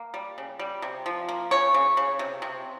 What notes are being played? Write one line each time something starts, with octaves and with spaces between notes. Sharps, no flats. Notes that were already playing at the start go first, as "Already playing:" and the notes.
Already playing: A#3
G3
C#3
G3
C3
F3
A#3
C#3 C#5
C#3
C#3
C3
C3